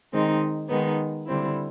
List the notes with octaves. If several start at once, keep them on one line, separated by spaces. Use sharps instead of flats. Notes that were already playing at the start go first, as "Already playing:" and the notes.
D#3 G#3 C4 D#4
D#3 G#3 B3 D#4
D3 G3 C4 E4